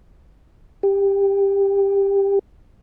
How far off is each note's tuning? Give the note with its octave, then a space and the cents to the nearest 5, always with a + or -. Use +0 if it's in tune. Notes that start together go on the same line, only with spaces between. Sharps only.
G4 +15